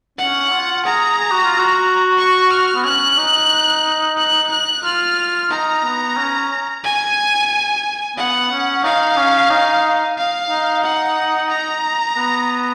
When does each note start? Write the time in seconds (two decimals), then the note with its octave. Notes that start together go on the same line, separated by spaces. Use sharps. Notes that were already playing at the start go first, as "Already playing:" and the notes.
0.18 C#4 F#5
0.51 F4
0.85 G#4 A#5
1.18 G#4
1.31 F#4
1.45 F4
1.58 F#4
2.18 C#6
2.51 F6
2.75 B3
2.85 C#4 F#6
3.17 D#4
4.18 F#6
4.51 F#6
4.84 F4 F6
5.51 D#4 A#5
5.84 B3
6.17 C#4
6.84 G#5
8.17 B3 F#5
8.51 C#4
8.84 D#4 F5
9.17 C#4
9.50 D#4
10.17 F5
10.50 D#4
10.83 F#5
11.50 A#5
12.17 B3